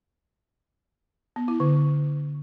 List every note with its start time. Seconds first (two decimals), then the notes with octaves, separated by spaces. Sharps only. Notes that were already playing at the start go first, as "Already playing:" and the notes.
1.36 B3
1.48 E4
1.60 D3